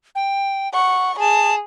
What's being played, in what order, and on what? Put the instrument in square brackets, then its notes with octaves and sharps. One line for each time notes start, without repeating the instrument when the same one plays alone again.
[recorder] G5
[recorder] F#5 [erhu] C#6
[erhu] G#4 [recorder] A5